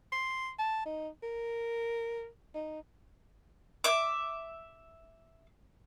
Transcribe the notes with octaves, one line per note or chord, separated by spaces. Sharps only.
C6
A5
D#4
A#4
D#4
E5 D6